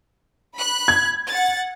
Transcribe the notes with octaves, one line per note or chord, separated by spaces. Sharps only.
B5 F#6
G#6
F#5 A6